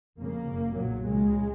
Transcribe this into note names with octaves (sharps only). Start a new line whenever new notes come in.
F1 F2 C#3 A#3
F#1 F#2 C#3
B1 A#2 F#3
C#2 C#3 G#3